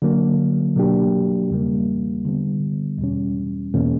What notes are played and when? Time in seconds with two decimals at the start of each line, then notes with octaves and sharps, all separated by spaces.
0.02 D3 F#3 A#3
0.76 B2 F#3 A#3 D4 G4
1.50 E2 C#3 G3 A#3
2.25 D3 G3 B3
2.99 E2 B2 G3 C#4
3.74 E2 B2 A#3 C#4